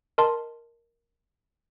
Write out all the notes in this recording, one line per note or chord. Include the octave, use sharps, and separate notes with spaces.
A#4 D#5 A5 C6